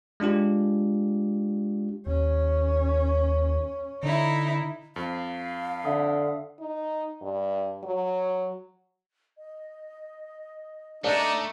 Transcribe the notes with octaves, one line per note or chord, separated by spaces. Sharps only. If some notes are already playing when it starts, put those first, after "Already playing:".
G#3 D4 F4 G4
D#2 C#4
D3 D#4 E4
F2 F5
D3 E5 F#5 D#6
D#4
G2
F#3
D#5
A3 D4 D#4 D5